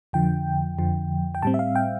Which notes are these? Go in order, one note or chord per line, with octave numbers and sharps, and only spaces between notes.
F2 D3 F3 G5
F2 D3 F3
G5
A2 G3 C4 A5
E5
F5
G5